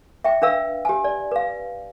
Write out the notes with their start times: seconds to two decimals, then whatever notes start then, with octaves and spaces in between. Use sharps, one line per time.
0.24 E5 G5
0.42 D4 B4 F5 E6
0.85 G4 G#5
1.04 D5
1.31 B4 F5